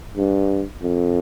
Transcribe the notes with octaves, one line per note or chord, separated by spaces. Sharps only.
G2
F2